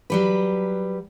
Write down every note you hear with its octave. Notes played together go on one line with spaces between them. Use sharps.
F#3 G3 B4